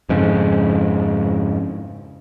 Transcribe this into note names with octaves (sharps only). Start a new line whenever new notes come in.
F2 G#2 C#3